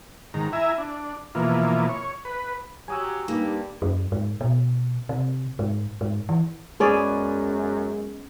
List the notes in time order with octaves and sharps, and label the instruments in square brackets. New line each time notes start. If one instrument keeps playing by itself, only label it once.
[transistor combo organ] G#2 D#3 A#5
E4 E5 G#5 A#5
D4
B2 E3 F3 A#3
C#5
B4
[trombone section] F#3 G4 [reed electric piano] G#5 D#6 E6
[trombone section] G2 G3 [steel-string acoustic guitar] A#3 [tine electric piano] D#4 G4
[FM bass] F#2
G#2
B2
C3
G#2
G#2
E3
[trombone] F#2 [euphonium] G#3 [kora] B3 C#4 D5 [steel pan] G#4